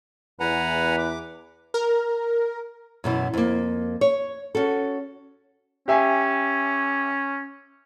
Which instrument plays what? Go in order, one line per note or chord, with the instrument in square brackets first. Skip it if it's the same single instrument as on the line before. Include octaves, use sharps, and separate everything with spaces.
[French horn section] E2 [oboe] B4 [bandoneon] F#5 G#5 A#5
[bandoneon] D6
[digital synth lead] A#4
[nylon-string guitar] F#2 B2 E3
F2 A#3
C#5
C#4 F#4 A4
[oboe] C#4 [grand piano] G4 E5 G#5